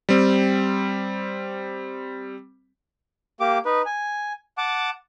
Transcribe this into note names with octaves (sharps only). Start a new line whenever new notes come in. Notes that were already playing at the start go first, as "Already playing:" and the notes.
G3 C4
A#3 G4 D6
D#4 B4
G#5
F#5 A5 D6